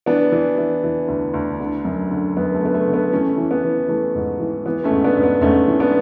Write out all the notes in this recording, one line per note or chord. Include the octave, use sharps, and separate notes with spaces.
E3 B3 D4
E3
E3
E3
D2
D2
D3
F#2
D3
F#2 B3
A3
D3 B3
A3
D3
B3
E3 A3 C#4
E3
B3
E3
E3 A3
G#2
E3
E3 B3
A3 C#4
G#2
B3 D4
G#2
B3
G#2 A3 C#4
E3
B3 D4